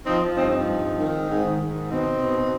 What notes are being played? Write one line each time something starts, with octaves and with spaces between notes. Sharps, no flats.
F3 C4 D#4
F3
G2 C4 D#4
F3 C4 D#4
G2
F3
D#3
G#2
G#2
D#3
G#2
D#3
B2 C4 D#4
B2
B2
B2